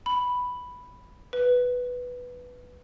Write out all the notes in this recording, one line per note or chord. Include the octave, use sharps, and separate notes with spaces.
B5
B4